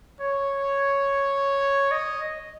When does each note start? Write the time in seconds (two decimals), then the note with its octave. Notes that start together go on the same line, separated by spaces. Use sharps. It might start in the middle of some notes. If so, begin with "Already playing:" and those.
0.21 C#5
1.91 D#5